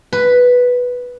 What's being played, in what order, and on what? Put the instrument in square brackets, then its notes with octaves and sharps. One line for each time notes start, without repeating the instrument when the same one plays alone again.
[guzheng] B4